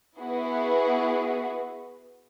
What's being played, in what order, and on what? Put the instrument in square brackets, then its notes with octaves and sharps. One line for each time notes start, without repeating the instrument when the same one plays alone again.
[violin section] B3 E4 F#4 G#4 B4